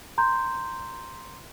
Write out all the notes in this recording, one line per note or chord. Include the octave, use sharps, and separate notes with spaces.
A#5 C6 G6